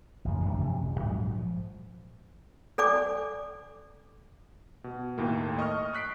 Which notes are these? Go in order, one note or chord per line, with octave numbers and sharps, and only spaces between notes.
A1 F2 C#3
F#2 D#3 A3 D4
C3 F3 C#4
D1
A#1 G#2 F3 F#3
F3
A4 D5 G#5 D6
B2
D#2 A2 A#3
D#5 C#6 D#6 F6
C#6 F#6 B6 C7 D7